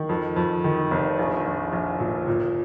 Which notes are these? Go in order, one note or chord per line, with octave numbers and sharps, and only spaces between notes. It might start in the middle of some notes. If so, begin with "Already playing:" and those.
Already playing: D#3
F2
F2
D#3
F1
A#1
A#1
A#1
A#2
A#2